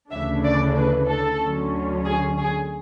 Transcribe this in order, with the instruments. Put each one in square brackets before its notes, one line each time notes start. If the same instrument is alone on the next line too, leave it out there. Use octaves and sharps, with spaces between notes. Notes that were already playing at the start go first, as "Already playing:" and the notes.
[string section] D2 C#3 E3 A3 D4 E5
D5
B4
A4
D2 D3 F#3 C#4
G#4
G#4